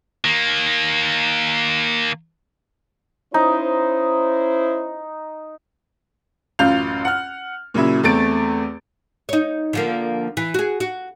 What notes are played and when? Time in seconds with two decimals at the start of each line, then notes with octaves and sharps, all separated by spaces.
0.25 D#3 A#3
3.34 C#4 D#4 E4 C5
6.59 A1 F#2 F4 F5 G6 F7
7.05 F#5 F6
7.74 A#2 C#3 F#3 E4
8.03 E2 A3 C4 A6 D7
9.29 D#4 C#5
9.73 D3 F3 A#3
10.37 E3
10.54 F#4 G#4
10.80 F#4